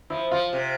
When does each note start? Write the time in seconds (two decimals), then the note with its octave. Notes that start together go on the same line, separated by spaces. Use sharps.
0.10 F3 E4
0.31 F3 F4
0.53 C3